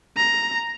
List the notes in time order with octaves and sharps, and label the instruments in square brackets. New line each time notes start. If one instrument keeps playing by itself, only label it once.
[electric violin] A#5